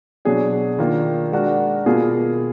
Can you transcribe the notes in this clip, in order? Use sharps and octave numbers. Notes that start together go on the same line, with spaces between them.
B2 F#3 D4 G#4
D#3 A#3 D4 F4
G#3 D4 F#4 A#4
B2 A#3 F4 G#4